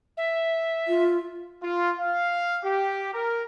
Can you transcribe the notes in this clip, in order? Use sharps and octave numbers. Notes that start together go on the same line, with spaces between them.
E5
F4
F4
F5
G4
A#4